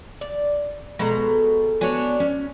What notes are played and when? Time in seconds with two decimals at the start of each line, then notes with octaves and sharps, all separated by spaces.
0.21 D5
0.99 B2 G#3 A4 C5 A#5
1.81 B3 D4 F#4 C#5 G#5
2.20 C#4